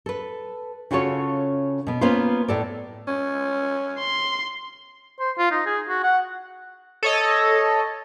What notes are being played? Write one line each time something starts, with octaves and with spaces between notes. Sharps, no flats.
A4 B4
C#3 C#4 F4 F#4 A4 C#5
B2 B3
A#3 B3 C#4 F4 B4 C5
A2 A4 D5
C#4
C6
C5
F4
D#4
G#4
F#4
F#5
A4 C#5 D#5